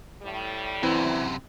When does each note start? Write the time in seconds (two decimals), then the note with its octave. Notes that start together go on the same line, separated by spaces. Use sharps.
0.23 A2 G3
0.83 F#2 C3 E3 C4 E4